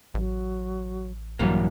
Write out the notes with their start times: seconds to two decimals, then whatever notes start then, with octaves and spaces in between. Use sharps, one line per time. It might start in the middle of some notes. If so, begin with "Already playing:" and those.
0.14 A1 F#3
1.39 A#1 G2 E3 F#3 G3 A#3